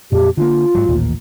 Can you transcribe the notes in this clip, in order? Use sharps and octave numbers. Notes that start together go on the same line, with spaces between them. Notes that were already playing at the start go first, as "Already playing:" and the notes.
F2 A#2 G4
D3 A#3 F4
G#2 F#3
A1 D#2 A#2